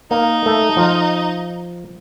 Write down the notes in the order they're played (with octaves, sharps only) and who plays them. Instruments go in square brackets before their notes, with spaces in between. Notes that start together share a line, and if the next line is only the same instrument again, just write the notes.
[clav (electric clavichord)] A#3 [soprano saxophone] D#4
[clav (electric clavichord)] A3
F3